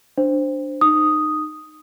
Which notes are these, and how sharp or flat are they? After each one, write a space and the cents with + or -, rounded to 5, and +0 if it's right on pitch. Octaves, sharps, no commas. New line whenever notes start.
D4 +0 C5 +0
D#4 -25 D#6 +0